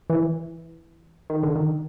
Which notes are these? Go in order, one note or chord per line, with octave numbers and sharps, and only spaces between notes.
E3
D#3
D3
D#3